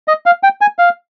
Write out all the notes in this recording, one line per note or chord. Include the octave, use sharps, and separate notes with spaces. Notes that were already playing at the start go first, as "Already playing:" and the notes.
D#5
F5
G5
G#5
F5